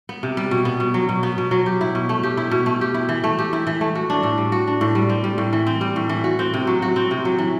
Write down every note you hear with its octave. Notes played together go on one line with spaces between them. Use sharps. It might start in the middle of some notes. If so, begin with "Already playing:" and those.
B3
C3
G3
B2
B3
B2
F#3
B2
B3
B2
F#3
G4
E4
B2
A3
G4
E4
B2
A3
G4
E4
E3
A3
G4
E4
E3
A3
F#4
D4
A2
G3
F#4
D4
A2
G3
C4
G3
A2
E3
C4
G3
A2
E3
F#4
C4
C3
F#3
F#4
C4
C3
F#3
E3